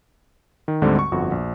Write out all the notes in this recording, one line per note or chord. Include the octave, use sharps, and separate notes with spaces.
D#3
D2 G#2 D3 G3 G#3 C4
C#6
G1 F2 F#4 C#6
A#1